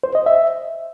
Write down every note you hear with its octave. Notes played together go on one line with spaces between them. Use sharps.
C5
D#5
E5